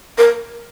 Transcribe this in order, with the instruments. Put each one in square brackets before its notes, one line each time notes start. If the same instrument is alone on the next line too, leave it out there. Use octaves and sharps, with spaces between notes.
[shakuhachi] A#4